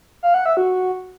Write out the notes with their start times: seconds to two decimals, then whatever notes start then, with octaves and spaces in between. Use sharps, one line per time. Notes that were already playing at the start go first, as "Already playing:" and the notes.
0.23 F5
0.34 F#5
0.46 E5
0.57 F#4